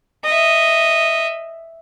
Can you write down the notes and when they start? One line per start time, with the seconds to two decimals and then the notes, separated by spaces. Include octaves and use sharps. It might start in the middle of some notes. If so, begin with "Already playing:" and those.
0.24 D#5 E5